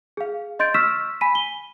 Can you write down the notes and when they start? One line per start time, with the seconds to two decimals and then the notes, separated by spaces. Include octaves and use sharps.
0.17 G#4 F5
0.59 D#5 C6 G6 A6 D7
0.74 C#6 E6 F6 B6 E7
1.21 G#5 B5 B6 D#7
1.35 G7